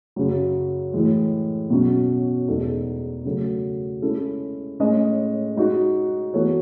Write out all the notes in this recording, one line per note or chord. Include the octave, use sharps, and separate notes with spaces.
F#2 C#3 F#3
A2 E3 G#3
B2 F#3 C#4
E2 B2 G#3 D#4 A4
C#3 F#3 A3
G#3 C#4 E4 A4
A2 G#3 C#4 G#4 D#5
G#3 D#4 F#4
E3 B3 F#4 A4 C#5